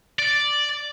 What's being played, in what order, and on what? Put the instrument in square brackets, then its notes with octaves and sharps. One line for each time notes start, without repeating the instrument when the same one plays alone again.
[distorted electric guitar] D5